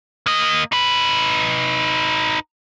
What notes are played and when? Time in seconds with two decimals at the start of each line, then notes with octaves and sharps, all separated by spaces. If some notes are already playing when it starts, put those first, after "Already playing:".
0.26 A#3 D#5
0.72 D#4 B4